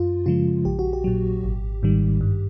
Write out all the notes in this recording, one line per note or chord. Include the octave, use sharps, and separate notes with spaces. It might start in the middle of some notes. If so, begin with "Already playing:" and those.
Already playing: F#2 F4
C#3 F3 G#3 F4
A#1 G4
F#4
G4
A#2 F#3
G#1
G#2 D#3 G3
G2